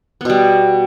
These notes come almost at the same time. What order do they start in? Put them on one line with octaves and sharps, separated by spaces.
B3 B2 G3